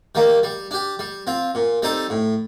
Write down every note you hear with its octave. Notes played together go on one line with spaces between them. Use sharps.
D#3 G3 A#3
G3
D4 G4
G3
C4 F4
A#2
G3 C4 D#4 A4
A2